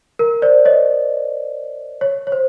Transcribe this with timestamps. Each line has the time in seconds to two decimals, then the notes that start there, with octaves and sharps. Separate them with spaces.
0.19 A#4
0.42 C5 D5
0.65 C#5 D#5
2.01 C#5
2.27 C#5
2.32 C5